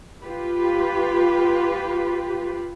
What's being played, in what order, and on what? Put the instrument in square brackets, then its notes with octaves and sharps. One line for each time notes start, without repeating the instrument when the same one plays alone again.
[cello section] F4 G4 B4